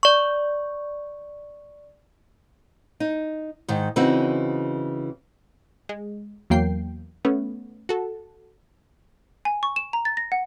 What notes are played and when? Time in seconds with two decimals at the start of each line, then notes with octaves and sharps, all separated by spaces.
0.03 D5 C#6
3.00 D#4
3.68 G#2 D#3
3.96 C#3 E3 C4 D#4 F#4
5.89 G#3
6.50 E2 F#3 A#3 G5 C7
7.25 A3 B3 C#4
7.89 F#4 A4
9.45 G#5
9.63 C#6
9.76 E7
9.93 A#5
10.05 A6
10.17 A#6
10.32 F#5